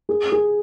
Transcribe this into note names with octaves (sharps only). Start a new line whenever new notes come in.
G#4
G#4